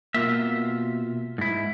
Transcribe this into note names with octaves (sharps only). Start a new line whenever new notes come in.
B2 A#3 F4 E5
G#2 E4